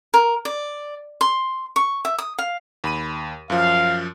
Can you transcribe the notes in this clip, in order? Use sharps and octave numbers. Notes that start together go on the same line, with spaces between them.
A#4
D5
C6
C#6
E5
D#6
F5
D#2 B5 D#7
F#2 F3 F5